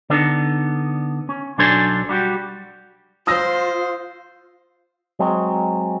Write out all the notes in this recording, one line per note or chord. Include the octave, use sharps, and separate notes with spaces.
D3 B3 D4 D#4 A4
C#4
B1 F#3 D4 A4 C5 G#5
G3 F#4 G4
F4 C5 D#6 E6 A#6
F#3 G#3 C4